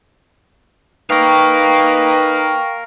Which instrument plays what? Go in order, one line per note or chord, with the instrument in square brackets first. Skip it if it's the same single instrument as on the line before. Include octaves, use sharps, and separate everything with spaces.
[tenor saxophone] D#4 [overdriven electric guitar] A#4 F5 [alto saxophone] B4 [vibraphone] G5 C#6